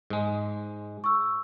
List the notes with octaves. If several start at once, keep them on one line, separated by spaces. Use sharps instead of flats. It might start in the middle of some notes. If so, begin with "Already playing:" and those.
G#2 G#3
C#6 E6